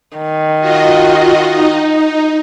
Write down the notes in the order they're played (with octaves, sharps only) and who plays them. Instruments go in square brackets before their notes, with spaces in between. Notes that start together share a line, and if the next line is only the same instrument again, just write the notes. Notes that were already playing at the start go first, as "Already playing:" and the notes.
[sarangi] D#3
[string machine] F4 F#4 D#5
D#4